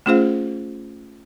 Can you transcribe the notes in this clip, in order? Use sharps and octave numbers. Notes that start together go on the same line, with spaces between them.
A3 C#4 F4 G#4 C5 F5